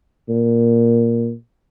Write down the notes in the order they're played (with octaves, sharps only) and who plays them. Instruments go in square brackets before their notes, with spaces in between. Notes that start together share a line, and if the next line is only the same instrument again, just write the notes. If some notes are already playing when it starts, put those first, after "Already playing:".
[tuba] A#2